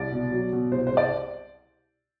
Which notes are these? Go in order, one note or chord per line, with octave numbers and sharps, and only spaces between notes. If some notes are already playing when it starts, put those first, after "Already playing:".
Already playing: C2 D5
B2
F#3
B2
C2 C5
C5
C2
D5